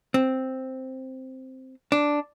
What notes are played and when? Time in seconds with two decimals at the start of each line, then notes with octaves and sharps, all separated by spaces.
0.14 C4
1.92 D4